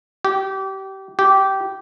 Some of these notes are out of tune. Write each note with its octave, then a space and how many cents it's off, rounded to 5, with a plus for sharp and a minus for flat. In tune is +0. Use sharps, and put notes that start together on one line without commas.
G4 -25
G4 -15